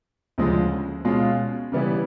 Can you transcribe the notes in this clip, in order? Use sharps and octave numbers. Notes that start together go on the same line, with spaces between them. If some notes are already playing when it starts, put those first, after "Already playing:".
D2 C#3 F3 G#3
B2 G#3 C#4 F4
C#3 E3 G3 B3 E4